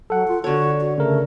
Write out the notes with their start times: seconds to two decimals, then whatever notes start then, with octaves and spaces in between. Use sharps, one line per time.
0.10 F#3 A4 F#5
0.28 F4
0.44 D3 F#4 A4 C#5
0.81 F#4
0.98 C#3 A3 A#4